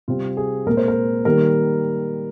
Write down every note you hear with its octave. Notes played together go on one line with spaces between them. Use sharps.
C3 G3 C4 F4
G#4
A#2 G#3 C4 A#4
C5
A#4
D#3 G3 A#3 A#4